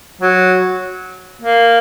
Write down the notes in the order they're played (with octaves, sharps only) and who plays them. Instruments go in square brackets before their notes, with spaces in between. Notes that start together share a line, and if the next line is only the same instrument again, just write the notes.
[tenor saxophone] F#3
A#3